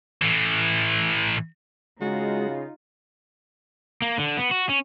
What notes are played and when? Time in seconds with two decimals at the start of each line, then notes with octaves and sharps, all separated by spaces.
0.22 A2 E3
2.01 C#3 G#3 D#4 F4 F#4
4.02 A#3
4.18 D3
4.37 B3
4.51 F#4
4.69 C#4